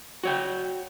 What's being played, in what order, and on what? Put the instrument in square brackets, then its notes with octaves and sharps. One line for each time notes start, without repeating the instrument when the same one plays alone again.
[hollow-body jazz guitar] F#4 C#5 G5